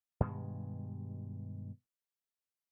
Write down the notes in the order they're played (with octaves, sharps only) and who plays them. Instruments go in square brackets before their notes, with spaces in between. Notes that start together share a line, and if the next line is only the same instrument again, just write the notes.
[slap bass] G2 B2 D#3 G#3